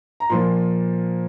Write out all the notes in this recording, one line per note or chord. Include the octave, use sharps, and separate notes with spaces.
A#5
A#2 F3 A#3 C6